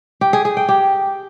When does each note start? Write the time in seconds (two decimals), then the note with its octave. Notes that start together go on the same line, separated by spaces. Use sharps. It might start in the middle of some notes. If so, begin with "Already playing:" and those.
0.21 G4
0.33 G#4
0.45 G#4
0.57 G5
0.69 G4